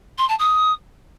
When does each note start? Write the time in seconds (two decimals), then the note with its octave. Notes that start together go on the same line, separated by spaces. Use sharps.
0.18 C6
0.28 A5
0.39 D#6